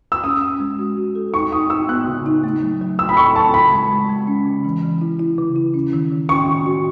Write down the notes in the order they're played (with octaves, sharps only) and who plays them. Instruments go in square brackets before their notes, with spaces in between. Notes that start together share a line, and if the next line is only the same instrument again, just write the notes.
[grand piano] E6
[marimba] C#4 [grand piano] D#6
[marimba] C#4
G#3
F#4
F#4
A4
[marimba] D#4 [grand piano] C#6
[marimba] D#4 [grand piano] D#6
[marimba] D#4 [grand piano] E6
[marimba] B3 [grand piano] F#6
[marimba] C#3
D#4
A3
F#3
F#3
[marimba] F#3 [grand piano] E6
[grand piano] B5
[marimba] A4 [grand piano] C#6
[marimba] A4 [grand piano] A5
[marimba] C#3 [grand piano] B5
[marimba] G#3
G#3
G#3
C#4
C#3
E3
E3
E4
E4
C#3
E4
C#4
D#3
D#3
[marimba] C#4 [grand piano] C#6
[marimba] D#3
F#4